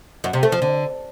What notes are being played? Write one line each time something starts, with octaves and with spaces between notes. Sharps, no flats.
F#2
C3
A3
F3
D3